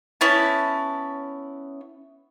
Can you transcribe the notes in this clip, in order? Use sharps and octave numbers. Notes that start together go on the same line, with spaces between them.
B3 C#4 E4 A5